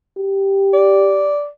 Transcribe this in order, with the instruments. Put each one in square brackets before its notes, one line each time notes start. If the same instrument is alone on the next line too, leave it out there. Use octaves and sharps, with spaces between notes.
[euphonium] G4
[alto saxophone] D5